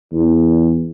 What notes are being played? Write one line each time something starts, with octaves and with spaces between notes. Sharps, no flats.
E2